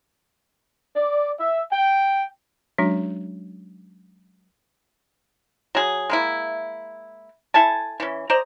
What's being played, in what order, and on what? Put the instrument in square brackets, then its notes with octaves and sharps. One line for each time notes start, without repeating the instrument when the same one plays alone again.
[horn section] D5
E5
G5
[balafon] F#3 G#3 C#4 D4 F#4
[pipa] F#3 G#4
G#3 A#3 E4
E4 A4 G#5 A5
E3 C#4
C5 D5 D#5 A#5